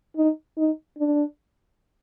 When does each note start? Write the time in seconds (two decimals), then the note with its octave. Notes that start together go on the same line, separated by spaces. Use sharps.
0.16 D#4
0.57 D#4
0.98 D4